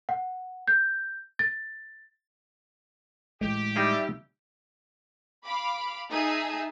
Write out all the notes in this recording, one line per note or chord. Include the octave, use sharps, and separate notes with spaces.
F#5
G6
A6
A2 E3 G#3 G4
G3 D#4 G#4 D5 E5
F5 B5 D6
D#4 G#4 E5 G#5 A5 D#6